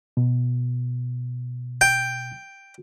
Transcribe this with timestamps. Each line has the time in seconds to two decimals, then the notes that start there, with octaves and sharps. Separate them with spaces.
0.17 B2
1.81 G5